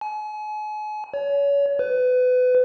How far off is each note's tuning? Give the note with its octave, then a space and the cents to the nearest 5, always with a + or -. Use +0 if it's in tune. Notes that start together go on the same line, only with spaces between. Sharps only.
G#5 +40
C#5 +30
B4 +30